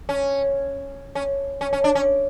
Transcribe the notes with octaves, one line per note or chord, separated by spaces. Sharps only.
C#4
C#4
C#4
C#4
D4
C#4